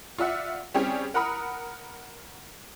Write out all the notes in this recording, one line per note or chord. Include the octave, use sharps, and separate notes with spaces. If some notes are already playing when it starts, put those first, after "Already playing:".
F4 D5 E5 F#5
G3 C4 C#4 G4 G#4
A#4 F#5 A#5 B5 D#6 F6